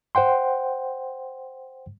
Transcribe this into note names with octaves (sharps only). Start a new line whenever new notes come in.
C5 F#5 G5 C6